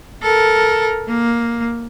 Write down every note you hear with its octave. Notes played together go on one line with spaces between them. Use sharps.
A4 A#4
A#3